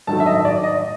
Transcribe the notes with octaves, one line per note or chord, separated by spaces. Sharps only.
G2 D#3 F#3 A3 A5
E5
D#5
D5
D#5